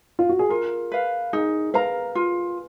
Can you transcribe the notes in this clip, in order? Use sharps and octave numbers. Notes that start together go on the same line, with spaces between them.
F4
F#4
G#4
F4 A#4
B4 F5
D#4 G#4
A#4 B4 F5 A#5
F4